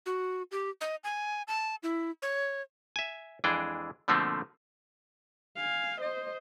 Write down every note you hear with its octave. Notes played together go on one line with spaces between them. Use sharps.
F#4
G4
D#5
G#5
A5
E4
C#5
E5 G#5
F2 E3 G#3 D4 G#4 G5
B2 D3 F3 A3 A#3 C4
F5 G#5
C5 D#5